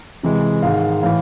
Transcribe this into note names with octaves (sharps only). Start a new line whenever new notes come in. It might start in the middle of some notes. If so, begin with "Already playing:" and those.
C3 E3 G#3
G#2 D#3 G#3 F5
A2 E3 F5